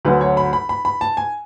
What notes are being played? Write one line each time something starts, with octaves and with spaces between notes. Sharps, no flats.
D2 D3 F#3 B4
C#5
B5
B5
B5
B5
A5
G#5